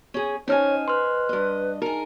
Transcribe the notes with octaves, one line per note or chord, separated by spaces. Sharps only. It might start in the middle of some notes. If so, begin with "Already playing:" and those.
C#4 G#4
C#4 D#4 C5 C#5 D#5 G#5 F6
B4 C6 F6
G2 D#5
D#4 G#4 A#4